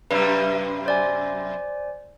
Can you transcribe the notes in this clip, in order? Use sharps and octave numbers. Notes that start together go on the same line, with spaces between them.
F#2 C3 G3 B4
C5 D5 G#5